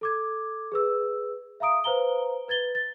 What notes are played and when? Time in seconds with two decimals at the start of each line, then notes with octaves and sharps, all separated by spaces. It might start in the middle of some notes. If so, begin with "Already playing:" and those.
0.01 A4 D6 G#6
0.72 G#4 B4 E6
1.60 E5 F5 A#5 D#6 D7
1.84 B4 C5 F5 A#5 G7
2.48 B4 G#6 A6 G7
2.75 A6